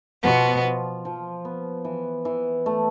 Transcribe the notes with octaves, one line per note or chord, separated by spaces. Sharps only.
B2 F3 B3
F4
F3
B3
E3
E3
A3